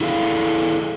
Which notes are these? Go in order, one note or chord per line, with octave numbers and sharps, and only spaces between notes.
E4 G#4 A4 D#5 F5